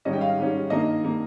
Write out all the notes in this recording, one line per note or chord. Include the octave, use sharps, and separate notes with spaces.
G#2 D#3 G3 C#4 D#5
G5
F5
G#2 D#3 G3 C#4
G2 D#3 A#3 D#5
D#3 A#3